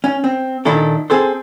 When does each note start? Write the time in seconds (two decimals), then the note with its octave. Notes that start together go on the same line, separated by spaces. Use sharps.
0.04 C#4
0.24 C4
0.65 A#2 D#3 D4 E4 A4
1.10 C4 G#4 A4 C5